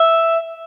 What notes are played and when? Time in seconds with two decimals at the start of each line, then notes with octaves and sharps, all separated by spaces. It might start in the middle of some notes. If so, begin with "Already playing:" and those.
Already playing: E5